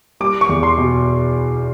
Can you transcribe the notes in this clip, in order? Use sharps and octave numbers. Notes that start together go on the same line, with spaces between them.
G3 D6
C#6
E2
C6
B2